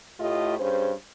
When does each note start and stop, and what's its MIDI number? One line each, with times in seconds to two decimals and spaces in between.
0.20 0.55 45
0.20 0.55 57
0.20 0.55 65
0.20 0.55 67
0.20 0.55 75
0.59 0.93 43
0.59 0.93 61
0.59 0.93 68
0.59 0.93 72